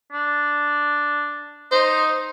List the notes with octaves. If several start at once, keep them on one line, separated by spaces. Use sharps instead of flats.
D4
D#4 C5